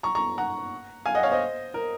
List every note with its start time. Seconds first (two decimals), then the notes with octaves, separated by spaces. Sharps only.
0.03 A#5 C#6
0.15 A#5 C#6
0.38 F#5 A#5
1.06 F5 G#5
1.15 D#5 F#5
1.23 C#5 F5
1.31 C5 D#5
1.74 A#4